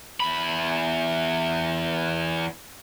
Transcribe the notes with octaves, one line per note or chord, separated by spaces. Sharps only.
E2 B5